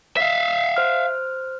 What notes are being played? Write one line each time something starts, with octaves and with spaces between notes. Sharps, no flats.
E5 F5 B6
C5 F6